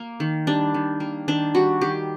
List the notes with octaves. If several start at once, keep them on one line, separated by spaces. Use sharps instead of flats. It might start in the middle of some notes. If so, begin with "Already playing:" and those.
Already playing: A#3
D#3
G3 D4
D#3
A#3
D#3 D4
G3 F#4
D#3 G4